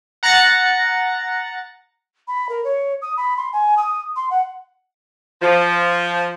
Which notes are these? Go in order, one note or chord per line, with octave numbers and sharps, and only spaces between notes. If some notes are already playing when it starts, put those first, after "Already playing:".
F#5 A#5 F#6 A6 A#6 C#7
B5
A#4
C#5
D#6
B5
C6
G#5
D#6
C6
F#5
F3